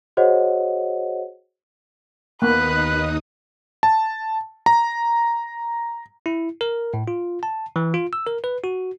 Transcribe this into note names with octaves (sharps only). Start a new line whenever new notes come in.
F#4 G#4 C5 C#5 D#5 F#5
D#2 A#3 B3 D#4 B4 D#6 F#6
A5
A#5
E4
A#4
A2
F4
A5
E3
F4
E6
A#4
B4
F#4